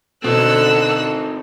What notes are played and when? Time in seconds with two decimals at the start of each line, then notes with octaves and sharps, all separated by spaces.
0.24 B2 D3 C4 D#4 A4 E6 F#6